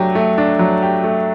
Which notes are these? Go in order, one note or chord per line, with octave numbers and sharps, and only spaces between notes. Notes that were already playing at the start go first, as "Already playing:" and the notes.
Already playing: F#3 A3 D4 G4
A3
D4
F#3
G4
A3